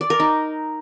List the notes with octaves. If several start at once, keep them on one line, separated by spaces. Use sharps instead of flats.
D5
A#4
D#4